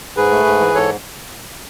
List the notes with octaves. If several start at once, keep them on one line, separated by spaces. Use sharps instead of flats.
G#2 G#4 B4
A3
G#2
E3
G#2 A4 C#5